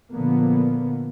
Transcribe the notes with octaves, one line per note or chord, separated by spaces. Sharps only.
A#2 D3 F3 A#3 B3